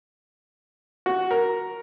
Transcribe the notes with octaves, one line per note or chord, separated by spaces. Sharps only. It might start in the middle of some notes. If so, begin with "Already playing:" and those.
F#4
A#4